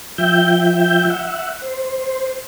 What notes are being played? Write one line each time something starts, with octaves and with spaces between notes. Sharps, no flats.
F3 E5 G5 G6
E5 F#5
C5